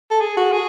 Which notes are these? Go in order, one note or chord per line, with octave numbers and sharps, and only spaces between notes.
A4
G#4
F#4
G#4